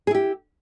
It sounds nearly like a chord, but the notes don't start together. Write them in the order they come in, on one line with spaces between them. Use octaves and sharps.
G#4 E4 G4